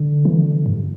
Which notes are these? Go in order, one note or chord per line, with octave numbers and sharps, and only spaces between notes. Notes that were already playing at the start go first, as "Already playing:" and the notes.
Already playing: D3
E3
D3
G2